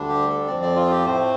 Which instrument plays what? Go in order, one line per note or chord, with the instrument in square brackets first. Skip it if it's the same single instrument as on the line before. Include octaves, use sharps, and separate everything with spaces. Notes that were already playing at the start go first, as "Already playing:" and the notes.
Already playing: [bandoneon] D2 D3 G3 D4
G4
A4
F2 F3 C4 D5
D5
F4
G4
A2 A3 C4 C5